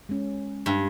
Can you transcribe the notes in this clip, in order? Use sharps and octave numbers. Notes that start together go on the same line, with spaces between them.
G#3 C#4
G2